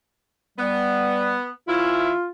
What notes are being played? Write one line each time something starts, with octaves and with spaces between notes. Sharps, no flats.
G3 B3
E3 C#4 E4 F4